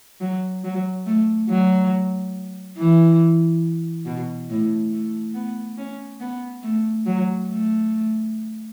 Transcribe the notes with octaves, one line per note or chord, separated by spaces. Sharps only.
F#3
F#3
A3
F#3
E3
B2
A2
A3
B3
C#4
B3
A3
F#3
A3